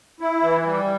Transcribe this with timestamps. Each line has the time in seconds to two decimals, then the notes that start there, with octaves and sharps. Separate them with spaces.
0.20 E4
0.42 E3
0.65 G3